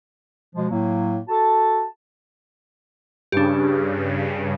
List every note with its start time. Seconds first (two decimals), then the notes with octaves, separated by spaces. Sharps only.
0.56 B2 F3 G#3
0.70 A2 F#3 A#3
1.29 F#4 A4 A5
3.32 G2 C#3 D4 G4